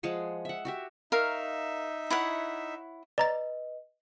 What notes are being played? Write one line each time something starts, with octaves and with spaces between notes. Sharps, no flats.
F3 G#3 G#4 F#5
E5 F#5
F#4 G4 E5
D#4 A#4 E5 F5 C#6
E4 C#5 F#5
B4 D5 D#5 A#5 A6